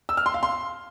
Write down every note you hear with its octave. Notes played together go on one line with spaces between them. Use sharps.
E6
F6
C6
F5
C6